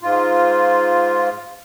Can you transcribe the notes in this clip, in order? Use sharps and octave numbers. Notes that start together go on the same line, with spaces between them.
G#2 F4